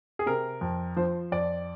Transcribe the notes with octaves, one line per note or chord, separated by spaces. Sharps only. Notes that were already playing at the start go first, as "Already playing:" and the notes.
G#4
C3 A#4
F2
F3 C5
F2 D5